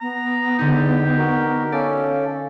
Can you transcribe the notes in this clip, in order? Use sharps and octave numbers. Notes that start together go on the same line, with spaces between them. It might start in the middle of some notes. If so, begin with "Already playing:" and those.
B3 A#5
E2 D3 D#4 G4
F#4 A#4
C#4 A4 D5 F5